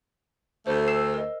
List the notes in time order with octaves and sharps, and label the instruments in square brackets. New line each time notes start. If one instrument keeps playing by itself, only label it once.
[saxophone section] D2 A3 [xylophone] C5
[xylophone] E6 C7 E7
A#4 D#5